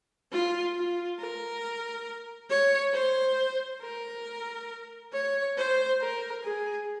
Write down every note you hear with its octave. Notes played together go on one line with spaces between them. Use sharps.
F4
F4
A#4
C#5
C5
A#4
C#5
C5
A#4
G#4